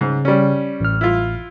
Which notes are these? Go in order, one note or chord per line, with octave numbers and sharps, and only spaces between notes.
G#2 C#3
G3 C#4
A1 F6
E4 F4